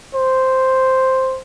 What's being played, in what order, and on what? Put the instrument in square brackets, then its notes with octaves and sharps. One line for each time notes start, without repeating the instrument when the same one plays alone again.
[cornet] C5